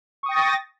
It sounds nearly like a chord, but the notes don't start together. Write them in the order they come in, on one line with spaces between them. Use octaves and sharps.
C#6 D#6 G5 A#6 A6